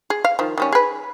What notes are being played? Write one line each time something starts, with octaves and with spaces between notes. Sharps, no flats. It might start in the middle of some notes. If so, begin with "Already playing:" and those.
G#4
F5
D#3 F3
D#3 G3 C#4
G#4 B4